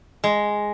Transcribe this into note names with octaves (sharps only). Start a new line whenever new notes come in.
G#3